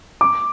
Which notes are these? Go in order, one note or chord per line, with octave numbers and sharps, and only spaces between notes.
D6